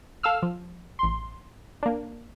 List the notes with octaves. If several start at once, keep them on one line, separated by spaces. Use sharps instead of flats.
A4 F5 E6 F6
F3
A1 C6
A#3 D4